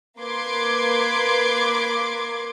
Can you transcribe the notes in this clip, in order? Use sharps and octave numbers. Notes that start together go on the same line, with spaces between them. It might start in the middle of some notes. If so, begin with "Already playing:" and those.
A#3 B4 C6 D6 G#6